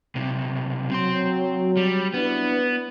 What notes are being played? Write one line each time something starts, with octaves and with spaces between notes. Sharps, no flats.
B1 C3
F#3 C4 C6
G3
B3 D4 E4 B4